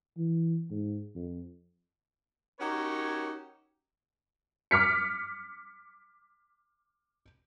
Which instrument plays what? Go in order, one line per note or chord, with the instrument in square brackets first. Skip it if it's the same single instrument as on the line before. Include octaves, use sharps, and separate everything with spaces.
[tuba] E3
G#2
F2
[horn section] C#4 D#4 F#4 G4 A#4 C#5
[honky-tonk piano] D6 F6 B6 C#7